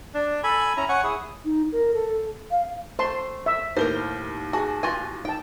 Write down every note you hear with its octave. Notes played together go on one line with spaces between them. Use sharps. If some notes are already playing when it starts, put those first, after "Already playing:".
D4
A4 G#5 B5
C#4 E4 A#5
C#5 F#5 G#5
E4 G#4
D#4
A#4
A4
F5
A3 C5 A5 C6
E5 E6
D#2 A2 A#4 C5 G7
F#4 G#4 G#5 A5
F4 F#4 G#5 G#6
D#4 G5 A5